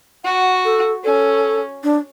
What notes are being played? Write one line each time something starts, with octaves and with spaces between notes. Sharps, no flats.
F#4 F#5
A4
C#4 A4
D4